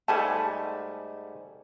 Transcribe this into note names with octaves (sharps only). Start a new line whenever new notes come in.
G#2 G3 A3 A4 G#5 A5